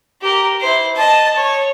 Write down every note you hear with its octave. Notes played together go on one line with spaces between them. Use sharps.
G4 A#4
E4 C5
D#5 A5
C#5